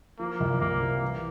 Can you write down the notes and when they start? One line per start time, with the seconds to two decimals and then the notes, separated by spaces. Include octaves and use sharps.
0.19 F3 A#3
0.40 C2
0.60 C2 A#3
0.81 C3
1.02 E3